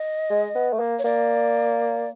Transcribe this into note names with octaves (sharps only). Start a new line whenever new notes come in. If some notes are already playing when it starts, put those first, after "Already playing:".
Already playing: D#5
G#3
B3
A3
A#3
C#5
A#3 D5